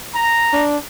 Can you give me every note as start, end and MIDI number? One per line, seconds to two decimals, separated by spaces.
0.15 0.66 82
0.53 0.77 62